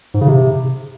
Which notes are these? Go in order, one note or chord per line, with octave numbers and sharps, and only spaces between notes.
G#2
C#3
C3